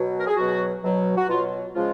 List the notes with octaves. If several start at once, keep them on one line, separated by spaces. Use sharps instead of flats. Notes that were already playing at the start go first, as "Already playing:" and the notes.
Already playing: B2 F#3
A#4
G#4
B2 F#3 F#4
B2 F#3
F#4
B2 F#3 F4
C#3 F3 G#3 F4